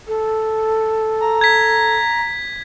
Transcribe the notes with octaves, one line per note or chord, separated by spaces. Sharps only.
A4
A#5
G#6 B6